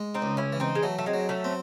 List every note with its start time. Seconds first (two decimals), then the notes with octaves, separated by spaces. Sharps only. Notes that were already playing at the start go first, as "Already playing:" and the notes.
Already playing: G#3
0.14 C4 D#4
0.22 C#2
0.37 C#4 E4
0.53 E3
0.60 C4 D#4
0.75 G#3
0.83 F#3 A3
0.98 A3
1.06 G#3 C4
1.14 F#3
1.29 A3 C#4
1.44 C4